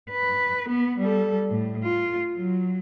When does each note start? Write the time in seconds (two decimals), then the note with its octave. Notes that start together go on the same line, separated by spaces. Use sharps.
0.11 B4
0.69 B3
0.99 G3 A4
1.50 A2
1.84 F4
2.37 F#3